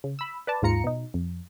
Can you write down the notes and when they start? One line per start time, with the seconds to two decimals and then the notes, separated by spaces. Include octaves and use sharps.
0.04 C#3
0.19 B5 E6
0.47 B4 D5 A5
0.62 D#2 G#2 F4 A#5 C#7
0.84 B2 D#4
1.14 F2